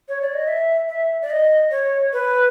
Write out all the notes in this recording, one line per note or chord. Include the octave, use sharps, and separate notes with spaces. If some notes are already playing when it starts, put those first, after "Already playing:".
C#5
D5
D#5
E5
E5
D5
D#5
C#5
B4